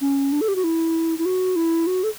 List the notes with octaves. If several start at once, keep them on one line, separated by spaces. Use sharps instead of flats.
C#4
D4
A4
G4
F#4
E4
E4
F#4
E4
F#4
A4